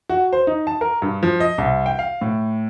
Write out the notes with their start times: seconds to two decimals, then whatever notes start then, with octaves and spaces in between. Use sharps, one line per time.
0.09 F#4
0.33 C5
0.47 D#4
0.67 A5
0.81 A#4
1.02 G2
1.23 F3
1.40 D#5
1.58 C2
1.86 G5
1.99 F5
2.21 A2